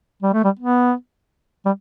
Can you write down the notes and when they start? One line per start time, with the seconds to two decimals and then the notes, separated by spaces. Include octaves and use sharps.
0.23 G3
0.34 A3
0.44 G3
0.59 B3
1.65 G3